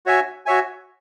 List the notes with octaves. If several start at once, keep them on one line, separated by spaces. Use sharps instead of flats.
F#4 C#5 E5 G#5
F#4 C#5 E5 G#5